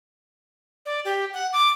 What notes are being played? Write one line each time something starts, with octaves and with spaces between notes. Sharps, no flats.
D5
G4
F#5
D6